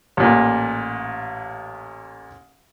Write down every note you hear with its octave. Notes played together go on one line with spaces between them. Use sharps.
A1 A#2